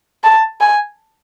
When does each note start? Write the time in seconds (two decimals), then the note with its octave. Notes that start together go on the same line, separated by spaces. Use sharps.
0.24 A5
0.61 G#5